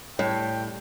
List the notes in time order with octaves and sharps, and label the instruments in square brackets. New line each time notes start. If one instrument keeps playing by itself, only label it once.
[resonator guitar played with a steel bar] A2 [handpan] G3 [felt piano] C#5 [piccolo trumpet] G5